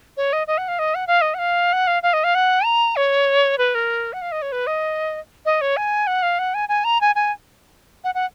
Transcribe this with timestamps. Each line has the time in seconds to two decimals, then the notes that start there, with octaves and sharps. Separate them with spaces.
0.17 C#5
0.33 D#5
0.47 D#5
0.58 F#5
0.68 F5
0.79 D#5
0.95 F#5
1.07 F5
1.21 D#5
1.34 F#5
1.39 F5
1.73 F#5
1.87 F5
2.03 F5
2.13 D#5
2.24 F5
2.35 F#5
2.65 A#5
2.96 C#5
3.58 B4
3.75 A#4
4.13 F#5
4.22 F5
4.32 D#5
4.42 C#5
4.52 B4
4.67 D#5
5.46 D#5
5.61 C#5
5.77 G#5
6.07 F#5
6.23 F5
6.39 F#5
6.54 G#5
6.69 G#5
6.84 A#5
7.01 G#5
7.15 G#5
8.04 F#5
8.15 F#5